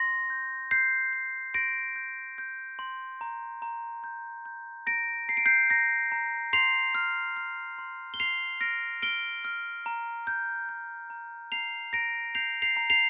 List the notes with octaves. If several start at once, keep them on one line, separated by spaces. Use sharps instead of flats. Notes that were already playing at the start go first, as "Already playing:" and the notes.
Already playing: C6 A#6
G6
G6 C7
G6
C6 A#6 D7
G6
G6
C6
A#5
A#5
G6
G6
A#5 A#6 D7
A#5 C7
D7
G6 C7
A#5 A#6
A#5
C6 C7 F7
F6
F6
C6
G7
C6 C7 F7
F6 A#6 D7
F6 D7 G7
F6
A#5
G6
G6
A#5
A#5 C7 F7
A#5 A#6 D7
G6 C7 F7
C7 F7
A#5
C7 F7